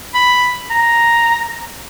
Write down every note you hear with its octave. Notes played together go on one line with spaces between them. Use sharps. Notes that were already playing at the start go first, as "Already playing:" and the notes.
B5
A#5